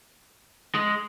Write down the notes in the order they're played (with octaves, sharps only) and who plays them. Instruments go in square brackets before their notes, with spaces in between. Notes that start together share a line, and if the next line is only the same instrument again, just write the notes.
[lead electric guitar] G#3